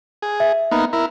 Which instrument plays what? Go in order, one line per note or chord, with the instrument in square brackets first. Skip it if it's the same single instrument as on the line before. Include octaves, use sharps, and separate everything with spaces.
[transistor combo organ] G#4
[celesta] E5
[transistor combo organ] A#3 B3 D#4
E4 A#4